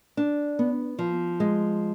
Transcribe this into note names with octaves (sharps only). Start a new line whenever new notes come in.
D4
B3
F3
G#3